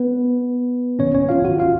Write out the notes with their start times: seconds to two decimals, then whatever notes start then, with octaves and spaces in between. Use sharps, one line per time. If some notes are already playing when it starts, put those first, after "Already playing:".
Already playing: B3 B4
0.99 G#2 D#3 F#3 A#3 C#4 C#5
1.14 C#4 C#5
1.29 F4 F5
1.44 F#4 F#5
1.59 F4 F5